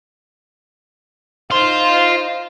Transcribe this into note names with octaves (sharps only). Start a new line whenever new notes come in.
D#4 C5 F5 C6